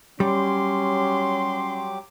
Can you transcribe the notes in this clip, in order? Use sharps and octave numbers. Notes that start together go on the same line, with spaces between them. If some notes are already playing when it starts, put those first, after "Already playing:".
F#3 G3 C#4 G4 C6 D6